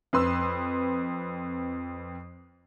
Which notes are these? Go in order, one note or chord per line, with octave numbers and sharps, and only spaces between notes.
F2 B4 C6 E6